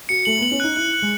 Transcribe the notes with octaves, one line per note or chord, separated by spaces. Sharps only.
F#4 C#7
A3 F#7
B3 F#7
C#4
D#4 F#6
E4 F#6
F#6
G#3